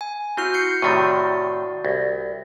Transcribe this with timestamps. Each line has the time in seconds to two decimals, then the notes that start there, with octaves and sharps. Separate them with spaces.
0.01 G#5
0.37 C4 E4 F#4 F6
0.54 G6 C7 C#7
0.82 A2 C3 D#3 F#4 D5
1.85 C2